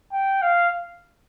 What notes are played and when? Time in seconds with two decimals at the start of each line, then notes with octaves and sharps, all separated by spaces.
0.13 G5
0.42 F5